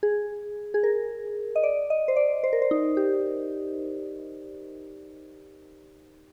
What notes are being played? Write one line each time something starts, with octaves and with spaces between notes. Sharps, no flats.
G#4
G#4
A#4
D#5
D5
D#5
C5
D5
C5
A#4
C5
D#4
G4